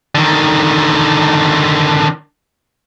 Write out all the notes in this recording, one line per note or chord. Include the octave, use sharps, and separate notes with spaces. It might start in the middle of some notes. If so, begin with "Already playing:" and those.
D3 D#3